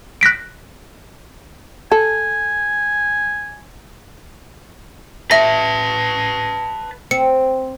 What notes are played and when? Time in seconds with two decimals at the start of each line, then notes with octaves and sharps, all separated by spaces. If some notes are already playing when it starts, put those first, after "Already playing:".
0.21 F#6 A#6 B6 D7
1.92 A4 G#5
5.31 B4 E5 A5 A#6
7.11 C4 C#7